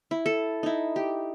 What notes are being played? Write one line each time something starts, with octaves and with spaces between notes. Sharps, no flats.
E4
A4
D#4 E4
G4